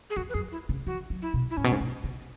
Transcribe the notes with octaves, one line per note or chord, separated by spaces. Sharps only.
G#4
E2 F#4
B4
F#2 G#4
E4
C#3
E3 F#4
F#3
E4
B2
E4
G#2 C#4
B2
G#2
B2
C#3